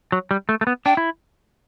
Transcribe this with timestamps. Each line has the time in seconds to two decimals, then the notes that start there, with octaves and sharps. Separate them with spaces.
0.12 F#3
0.31 G3
0.49 A3
0.61 A3
0.67 B3
0.86 D4 G5
0.97 E4